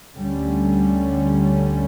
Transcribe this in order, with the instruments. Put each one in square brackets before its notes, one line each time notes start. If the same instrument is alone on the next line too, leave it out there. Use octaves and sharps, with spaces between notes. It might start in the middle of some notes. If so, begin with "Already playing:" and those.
[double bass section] D2 D3 G3 C#4